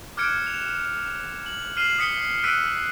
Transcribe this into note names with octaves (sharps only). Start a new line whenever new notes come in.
D6 F6 F#6 G#6 C#7 D7
E7 F7
F#7
F6 C7 D#7 E7 F#7
D#6 B6 C#7 G7
E6 F#6 B6 D7 D#7